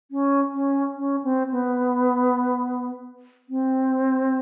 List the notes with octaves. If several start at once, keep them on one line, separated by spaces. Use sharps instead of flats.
C#4
C#4
C#4
C4
B3
C4